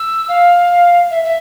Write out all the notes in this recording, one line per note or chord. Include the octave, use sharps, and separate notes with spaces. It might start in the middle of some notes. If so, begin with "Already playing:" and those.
Already playing: E6
F5
E5
E5